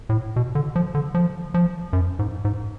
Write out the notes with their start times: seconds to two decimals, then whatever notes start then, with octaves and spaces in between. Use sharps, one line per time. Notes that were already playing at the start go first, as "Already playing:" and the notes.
0.09 A2
0.36 B2
0.55 D3
0.76 F3
0.95 D3
1.15 F3
1.54 F3
1.93 F#2
2.19 G#2
2.45 G#2